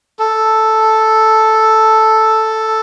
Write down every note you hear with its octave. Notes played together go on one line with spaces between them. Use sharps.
A4